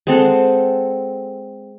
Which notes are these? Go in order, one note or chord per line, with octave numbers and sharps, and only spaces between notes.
G#3 C4 A4 F#5